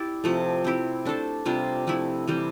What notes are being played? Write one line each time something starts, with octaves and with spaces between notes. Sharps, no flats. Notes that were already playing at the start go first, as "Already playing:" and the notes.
Already playing: E4 G4 D5
C3 F3 A3
C4 E4 G4
A3 D4 A4 C5
C3 G3 D4 F4
F3 A3 E4
C3 E3 G3 C4